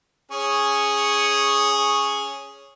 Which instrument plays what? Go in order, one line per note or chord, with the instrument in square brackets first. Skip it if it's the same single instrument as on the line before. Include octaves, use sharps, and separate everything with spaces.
[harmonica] C#4 G#4 C#5